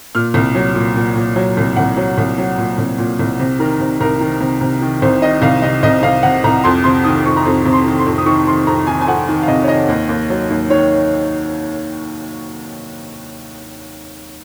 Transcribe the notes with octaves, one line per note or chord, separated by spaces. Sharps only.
A#2 F6
C2
F#3
A#2
A#2
A#2
F#3
C2
C2 F#5
F#3
C2
F#3
A#2
C2
A#2
C2
C3
D#3 A#4
C3
C2 A#4
D#3
C3
C3
D#3
C2 C5
D#3 D#5
C2 F5
C3 D#5
C2 D#5
C2 F5
C3 F#5
C2 A#5
F2 C6
C3 C6
D#3 D#6
F2 C#6
A#5
F2 C6
C3
C6
D#3
C6
F2
D#6
D#3 C#6
D#3 C6
F2 A#5
D#3 G#5
G#5
F2 F#5
D#3
F5
C3 D#5
C#5
D#3 D#5
D#2
D#2
F#3
D#2
D#3 C#5